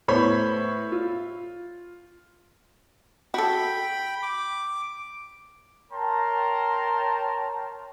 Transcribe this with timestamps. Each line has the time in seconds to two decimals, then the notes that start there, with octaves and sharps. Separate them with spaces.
0.08 A2 B3 C5 C#5 B5
0.92 F4
3.34 F#4 A4 G5 B5
4.23 D6
5.91 A#4 C#5 G5 A5 A#5 C6